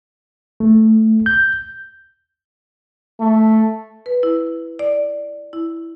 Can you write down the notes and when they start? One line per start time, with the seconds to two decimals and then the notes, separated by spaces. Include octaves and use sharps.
0.60 A3
1.26 G6
3.20 A3
4.06 B4
4.23 E4
4.79 D5
5.53 E4